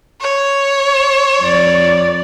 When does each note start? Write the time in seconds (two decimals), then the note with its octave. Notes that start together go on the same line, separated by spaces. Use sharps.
0.21 C#5
1.42 F2 D5